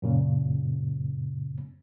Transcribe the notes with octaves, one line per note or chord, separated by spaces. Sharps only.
F#2 A#2 C#3